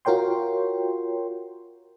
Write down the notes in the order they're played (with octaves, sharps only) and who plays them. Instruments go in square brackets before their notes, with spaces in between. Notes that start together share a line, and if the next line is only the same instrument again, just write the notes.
[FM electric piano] F4 F#4 A#4 C#5 G5 C6